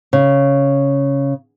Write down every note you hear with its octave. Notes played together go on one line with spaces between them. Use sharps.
C#3